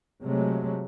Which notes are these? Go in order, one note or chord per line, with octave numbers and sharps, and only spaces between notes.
C3 F#3 G#3 A3